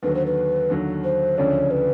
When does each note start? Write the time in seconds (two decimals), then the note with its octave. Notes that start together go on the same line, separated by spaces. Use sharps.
0.03 D#2 D3 F#3 B4
0.15 C5
0.26 B4
0.70 D#2 D3 F#3
1.04 C5
1.37 D2 C#3 F3 A3 D4 C#5
1.71 B4